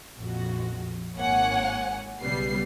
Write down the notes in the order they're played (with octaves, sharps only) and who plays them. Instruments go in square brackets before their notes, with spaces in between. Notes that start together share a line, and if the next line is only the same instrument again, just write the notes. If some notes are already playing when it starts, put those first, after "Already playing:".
[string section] A#1 F2 F#4
G#1 A#3 C#5 F#5 G#5
B1 C#3 G3 B3 C7